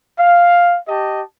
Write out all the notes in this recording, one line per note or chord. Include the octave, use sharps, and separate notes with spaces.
F5
G4 D#5 A5